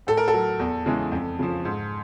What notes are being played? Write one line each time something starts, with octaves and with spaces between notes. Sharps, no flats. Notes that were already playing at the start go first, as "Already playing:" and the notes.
A2 A4
A#4
A4
F#3
E2
C#3 E3 G#3
F2
C#3 F3
G#2